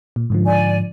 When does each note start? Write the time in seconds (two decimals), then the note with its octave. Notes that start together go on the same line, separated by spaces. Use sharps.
0.16 A#2
0.30 G#2 D3 F3
0.45 D5 G#5